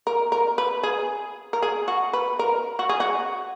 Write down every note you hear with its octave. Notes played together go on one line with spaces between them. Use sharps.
A#4
A#4
B4
G#4
A#4
G#4
F#4
B4
A#4
F#4
G#4
F#4